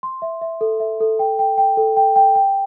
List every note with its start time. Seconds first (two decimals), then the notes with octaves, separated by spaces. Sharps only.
0.03 C6
0.22 E5
0.42 E5
0.61 A4
0.80 E5
1.00 A4
1.19 G5
1.39 G5
1.58 G5
1.77 A4
1.97 G5
2.16 G5
2.35 G5